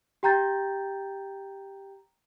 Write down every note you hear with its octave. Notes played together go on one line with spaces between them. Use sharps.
G4 G5 A#5 G6 A6